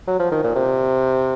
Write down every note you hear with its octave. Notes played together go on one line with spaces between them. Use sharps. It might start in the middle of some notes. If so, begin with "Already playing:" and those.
F#3
F3
D#3
A#2
C3